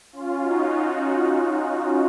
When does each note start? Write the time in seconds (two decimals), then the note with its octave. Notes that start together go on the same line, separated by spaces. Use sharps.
0.13 C#4 F4
0.41 D#4 F#4